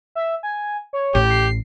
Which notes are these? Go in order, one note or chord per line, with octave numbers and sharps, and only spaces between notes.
E5
G#5
C#5
A1 A2 G4
C7